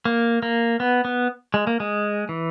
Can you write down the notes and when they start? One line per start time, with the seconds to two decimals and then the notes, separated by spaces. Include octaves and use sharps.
0.05 A#3
0.43 A#3
0.80 B3
1.05 B3
1.54 G#3
1.67 A#3
1.80 G#3
2.29 E3